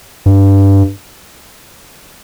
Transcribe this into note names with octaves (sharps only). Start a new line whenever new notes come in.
G2